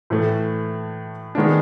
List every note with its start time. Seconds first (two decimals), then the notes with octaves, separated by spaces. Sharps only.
0.10 A2 E3 A3
1.35 D#3 G#3 B3 D4